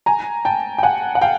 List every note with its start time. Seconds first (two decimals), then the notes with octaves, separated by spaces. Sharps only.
0.06 G#5 A#5
0.45 G5 A5
0.78 G5
0.83 F#5 G#5
1.15 F#5
1.21 F5 G5